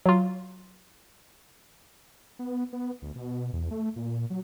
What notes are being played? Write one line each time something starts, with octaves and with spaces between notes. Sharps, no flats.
F#3 F4
B3
B3
D2
B2
E2
A3
A#2
F#3